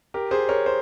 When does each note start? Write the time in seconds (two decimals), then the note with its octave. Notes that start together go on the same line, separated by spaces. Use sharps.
0.14 G4 A#4
0.31 G#4 C5
0.49 A#4 C#5
0.66 C5